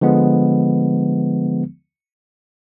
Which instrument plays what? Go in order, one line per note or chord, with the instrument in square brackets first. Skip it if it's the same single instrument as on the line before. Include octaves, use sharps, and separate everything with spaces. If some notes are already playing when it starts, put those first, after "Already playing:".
[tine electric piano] D3 F3 G#3 B3